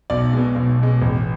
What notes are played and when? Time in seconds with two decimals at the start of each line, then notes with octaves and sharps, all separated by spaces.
0.10 B1 D5
0.33 B2 G#3
0.56 B1
0.79 B2 G#3
1.02 A1